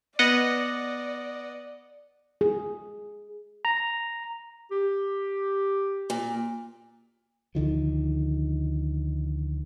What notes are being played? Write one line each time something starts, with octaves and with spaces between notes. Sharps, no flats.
B3 D5 D#5 F#5
G#4
A#5
G4
A#2
D2 D3 D#3 F3